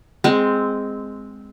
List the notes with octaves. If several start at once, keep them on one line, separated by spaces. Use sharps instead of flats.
G#3 C4